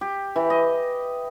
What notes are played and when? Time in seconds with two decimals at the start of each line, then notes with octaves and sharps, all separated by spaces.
0.01 G4
0.36 E3
0.50 D#5